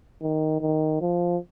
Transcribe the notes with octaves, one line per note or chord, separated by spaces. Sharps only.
D#3
D#3
F3